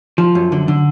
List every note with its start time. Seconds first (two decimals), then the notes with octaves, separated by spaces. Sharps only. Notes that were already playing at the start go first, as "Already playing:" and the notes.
0.18 F3
0.35 F#2
0.52 D3
0.68 D3